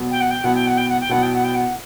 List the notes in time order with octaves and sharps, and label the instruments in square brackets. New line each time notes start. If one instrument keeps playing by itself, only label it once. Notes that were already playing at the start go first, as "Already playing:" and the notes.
Already playing: [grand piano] B2 F#3 B3
[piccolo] G5
F#5
G5
[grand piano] B2 F#3 B3 E4 [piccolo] F#5
[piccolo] G5
F#5
G5
F#5
G5
[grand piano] B2 F#3 B3 E4 [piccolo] F#5
[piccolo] G5
F#5
G5
F#5